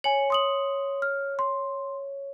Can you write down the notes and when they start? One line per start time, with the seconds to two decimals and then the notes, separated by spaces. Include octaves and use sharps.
0.04 C#5 G#5 F#7
0.30 C6 D#6 F#7
1.02 F6
1.39 C6